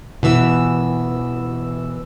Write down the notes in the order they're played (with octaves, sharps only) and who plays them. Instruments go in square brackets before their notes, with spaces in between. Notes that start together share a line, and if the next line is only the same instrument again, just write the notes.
[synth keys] B2 E3 E6